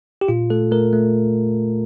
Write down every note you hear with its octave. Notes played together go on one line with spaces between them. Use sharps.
G4
A#2 F4
A3 A4
A3 A#4
A3